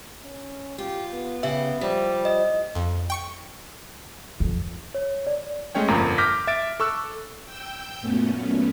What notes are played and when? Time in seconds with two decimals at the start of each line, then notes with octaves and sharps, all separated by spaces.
0.24 C#4
0.78 F4 G4
1.12 B3
1.43 C#3 G4 E5
1.81 F3 G3
2.25 D#5
2.75 F2
3.10 G5 C#6 C#7
4.40 F2
4.95 C#5
5.27 D5
5.75 G#3 A3 C#4 C#5 G5
5.88 G1 F2 A#2 A#3 A#5
6.18 D6 F6 G6 A#6 B6
6.47 E5 A6 D7
6.80 A4 C#6 E6 F#6
7.46 G5 E6 G6
8.01 F#2 A#2 A3 B3 C#4